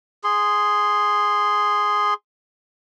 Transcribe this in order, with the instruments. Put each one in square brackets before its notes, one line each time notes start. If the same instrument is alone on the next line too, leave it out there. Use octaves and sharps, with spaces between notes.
[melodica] G#4 C6